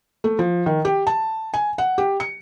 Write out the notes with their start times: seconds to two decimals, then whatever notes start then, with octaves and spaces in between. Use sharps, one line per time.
0.24 A3
0.39 F3
0.66 D#3
0.85 G4
1.07 A5
1.54 G#5
1.78 F#5
1.98 G4
2.20 C#7